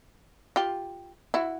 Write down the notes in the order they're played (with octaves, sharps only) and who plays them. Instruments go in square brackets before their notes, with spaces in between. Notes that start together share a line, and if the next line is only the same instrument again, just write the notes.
[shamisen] F4 G4
E4 F#4